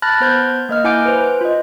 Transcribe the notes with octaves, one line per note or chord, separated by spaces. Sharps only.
A5 B5 F6 F#6 A6 A#6
B3 C5 G6 G#6
A#3 D#5 F6
E4 F#5 G#5 D6 G6 D7
B4 C5
F4 D#5